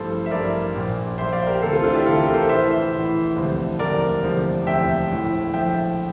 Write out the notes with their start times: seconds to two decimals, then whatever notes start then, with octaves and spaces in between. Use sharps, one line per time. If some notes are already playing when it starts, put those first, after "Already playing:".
Already playing: A1 G2 F3 A4 C5
0.26 E5
0.31 A1 G2 F3 A#4 D5
0.75 A#1 A#2 F3
1.18 A#1 A#2 F3 C5 E5
1.32 D5 F5
1.47 G4 A#4
1.62 D2 C3 E3 A4 C5
1.73 F4 A4
1.84 D4 F4
1.95 E4 G4
2.06 D2 C3 E3 F4 A4
2.20 G4 A#4
2.34 A4 C5
2.49 A#1 A2 E3 C5 E5
2.93 A#1 A2 E3
3.36 E1 D2 C3 F3
3.79 E1 D2 C3 F3 A#4 D5
4.23 E1 D2 C3 F3
4.67 E1 D2 C3 F3 E5 G5
5.10 A#1 A2 F3
5.54 A#1 A2 F3 E5 G5